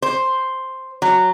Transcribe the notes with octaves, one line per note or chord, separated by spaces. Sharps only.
C5
F#3